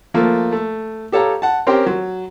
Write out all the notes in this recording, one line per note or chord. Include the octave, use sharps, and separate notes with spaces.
F3 A3 A#3
A3
G4 A4 C#5 F5 A#5
F#5 A5
C4 C#4 G4 A#4 C5 G5
F#3